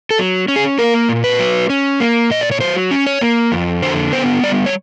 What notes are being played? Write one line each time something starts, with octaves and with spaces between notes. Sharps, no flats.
A4
F#3
C#4
G#4
A#3 A#4
A#2
B4
F#3
C#4
A#3
A#2 D#5
D5
C#5
F#3 C5
C#4
C#5
A#3
F2
D3 C5
B3 C5
G3 D5
C#5